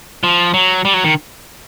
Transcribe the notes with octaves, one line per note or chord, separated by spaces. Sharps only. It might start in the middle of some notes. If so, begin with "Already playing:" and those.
F3
F#3
G3
F#3
D#3